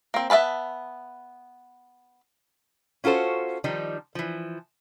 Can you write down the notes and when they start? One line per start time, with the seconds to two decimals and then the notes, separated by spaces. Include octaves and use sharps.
0.14 A#3 C4
0.30 B3 E5 F5 A5 B5
3.04 C#4 F4 F#4 A4 C5
3.64 D#3 F3 G3 D#4
4.15 E3 F3